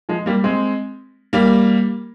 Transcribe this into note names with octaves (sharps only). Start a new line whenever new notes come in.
F3 G#3
G3 A#3
G#3 C4
G3 A#3